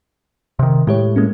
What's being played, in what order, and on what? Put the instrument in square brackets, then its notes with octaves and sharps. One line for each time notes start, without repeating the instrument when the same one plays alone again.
[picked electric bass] C3 D#3
[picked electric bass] A2 [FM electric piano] G#3 G4 C#5
[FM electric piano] G#3 A#3 C#4